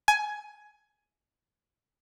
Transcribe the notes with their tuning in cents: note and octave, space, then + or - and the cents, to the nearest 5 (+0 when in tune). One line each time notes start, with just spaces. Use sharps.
G#5 +15